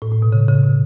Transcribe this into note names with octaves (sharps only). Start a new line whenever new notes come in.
A2
A2
B2
C#3
C#3
B2